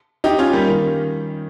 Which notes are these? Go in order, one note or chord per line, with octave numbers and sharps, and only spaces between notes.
D#4 G4
C#4 F4
G3 A#3
D#3